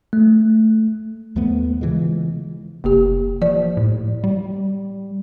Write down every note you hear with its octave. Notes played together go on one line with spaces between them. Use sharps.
A3
D#2 F3 A3 B3
C#3 E3 F3 G#3
F1 A#3 G4
F3 D5
A2
G3